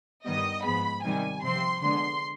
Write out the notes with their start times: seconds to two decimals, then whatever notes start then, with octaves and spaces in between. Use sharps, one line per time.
0.25 G2 D#3 G3 B3 D#5
0.64 G#2 F3 G#3 B3 B5
1.03 C3 D#3 G3 G#5
1.42 C3 F3 C4 C6
1.82 D3 G#3 B3 C6